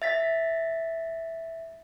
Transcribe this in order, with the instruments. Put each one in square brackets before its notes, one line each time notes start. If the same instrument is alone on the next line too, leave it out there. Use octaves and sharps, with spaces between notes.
[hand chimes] E5 A6 B6